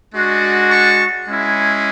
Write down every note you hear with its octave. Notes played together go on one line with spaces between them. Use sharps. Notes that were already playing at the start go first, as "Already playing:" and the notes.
G#3 D4 F#4
A5 C#6
G#3 C#4 E4